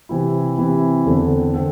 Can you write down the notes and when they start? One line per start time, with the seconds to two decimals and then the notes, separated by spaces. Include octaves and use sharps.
0.09 C3 E3 C4 E4
0.58 C3 E3 C4 E4
1.06 E2 D3 C4 A4
1.54 D3 C4 A4